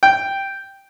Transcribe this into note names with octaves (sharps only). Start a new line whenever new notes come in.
G5